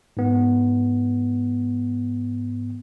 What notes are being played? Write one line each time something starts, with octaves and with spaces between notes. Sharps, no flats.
G#2 B3